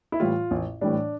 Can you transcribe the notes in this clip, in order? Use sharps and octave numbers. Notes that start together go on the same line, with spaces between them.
E4
A2 E3 G3 F4
A1
A2 E3 G3 D4